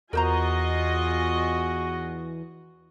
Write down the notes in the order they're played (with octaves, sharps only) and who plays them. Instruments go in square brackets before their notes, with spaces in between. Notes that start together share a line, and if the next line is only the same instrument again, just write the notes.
[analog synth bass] E2 [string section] F4 D#5 G#5 [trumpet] F#4 [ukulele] A#4 C5 A#5